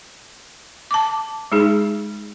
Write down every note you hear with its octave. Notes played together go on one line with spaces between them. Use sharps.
A5 D6
G#3 D#4 G#4